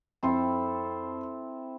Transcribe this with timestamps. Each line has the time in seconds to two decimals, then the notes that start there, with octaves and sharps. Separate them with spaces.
0.23 F2 C4 E4 A4 C6